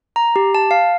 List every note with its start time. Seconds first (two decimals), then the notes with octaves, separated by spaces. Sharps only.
0.16 A#5
0.36 G4
0.55 A5
0.71 F5